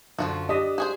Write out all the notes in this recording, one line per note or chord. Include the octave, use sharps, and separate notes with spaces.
F#2 D3 F3 F4 F#4
D4 G4 D#5 B6
F#4 G#4 C5